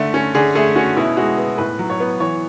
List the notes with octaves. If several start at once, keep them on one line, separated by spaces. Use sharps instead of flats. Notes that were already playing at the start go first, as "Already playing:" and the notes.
Already playing: D3 A3
C#4
D3 G#4
A3 G#4
C#4 F#4
B2 E4
G#3 F#4
B3
A2 B4
F#3
C#5
B3
E3 C#5